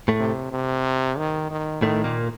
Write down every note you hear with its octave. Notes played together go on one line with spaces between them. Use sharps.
A2 A3
C3
C3
D#3
D#3
A2 D#3 A3
A#2 A#3